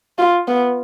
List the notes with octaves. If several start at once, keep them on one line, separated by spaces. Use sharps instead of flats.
F4
B3